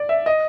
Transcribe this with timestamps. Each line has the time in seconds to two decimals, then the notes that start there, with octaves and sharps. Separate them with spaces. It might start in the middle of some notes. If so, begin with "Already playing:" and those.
Already playing: D5
0.09 E5
0.26 D#5